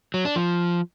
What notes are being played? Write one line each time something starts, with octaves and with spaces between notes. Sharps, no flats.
F#3
D4
F3